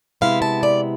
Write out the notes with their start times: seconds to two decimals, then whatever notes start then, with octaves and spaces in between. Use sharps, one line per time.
0.21 C3 G#3 B3 E4 F5
0.42 A5
0.63 D5